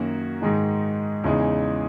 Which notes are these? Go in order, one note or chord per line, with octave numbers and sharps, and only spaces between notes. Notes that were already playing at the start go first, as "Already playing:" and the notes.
Already playing: F#2 D#3 A#3 C#4 F#4
G#2 D#3 G#3 D#4
E2 C#3 E3 G#3 D#4